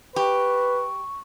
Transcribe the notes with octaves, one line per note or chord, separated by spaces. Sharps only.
G4 B4 C#6